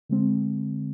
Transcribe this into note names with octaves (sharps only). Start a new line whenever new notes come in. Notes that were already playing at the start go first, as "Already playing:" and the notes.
D3 G#3 C4